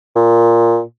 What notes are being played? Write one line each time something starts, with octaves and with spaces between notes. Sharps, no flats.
A#2